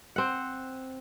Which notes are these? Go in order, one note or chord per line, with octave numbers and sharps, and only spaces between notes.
C4 F#5